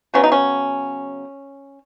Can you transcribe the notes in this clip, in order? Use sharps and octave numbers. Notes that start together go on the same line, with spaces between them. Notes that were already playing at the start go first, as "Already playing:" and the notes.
C#3 F#3 B3 C#4
D#4
C#4